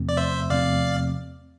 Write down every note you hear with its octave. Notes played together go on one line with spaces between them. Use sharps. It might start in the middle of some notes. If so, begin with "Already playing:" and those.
Already playing: E2 C3 F3 A3 C4
D5
C5 E5
E2 C3 F3 A3 C4 D5 F5